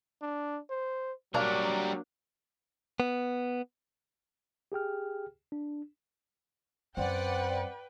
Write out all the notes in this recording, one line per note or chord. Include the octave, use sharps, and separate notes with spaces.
D4
C5
F#3 G3 A#3 D4 A#4 C#5
B3
G4 G#4 G5 F6
D4
F#2 C4 B4 D5 F#5 G5